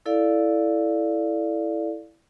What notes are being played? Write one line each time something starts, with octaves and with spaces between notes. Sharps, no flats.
E4 A4 D5 F5